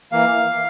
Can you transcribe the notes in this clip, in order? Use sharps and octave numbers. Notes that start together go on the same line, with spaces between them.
E3 A#3 F5